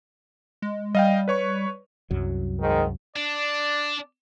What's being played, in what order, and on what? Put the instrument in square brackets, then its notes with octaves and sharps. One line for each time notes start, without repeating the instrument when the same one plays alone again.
[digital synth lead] G#3
[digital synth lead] G3 [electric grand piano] D#5 F5 G5
[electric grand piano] B4 C#5 C#6
[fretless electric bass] C2 F#2 F#3
[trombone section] G#2 D#3
[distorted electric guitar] D4 [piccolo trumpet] D5